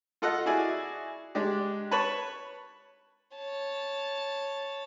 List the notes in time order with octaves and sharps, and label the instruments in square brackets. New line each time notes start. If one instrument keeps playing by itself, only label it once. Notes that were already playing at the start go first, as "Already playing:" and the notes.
[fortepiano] F4 A4 D#5 F#5
E4 F#4 G#4 D5 G#5
G#3 D4 G4
B4 C#5 A5 B5 C#6
[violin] C#5 A5